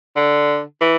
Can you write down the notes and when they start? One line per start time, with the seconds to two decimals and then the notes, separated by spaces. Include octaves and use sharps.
0.16 D3
0.81 E3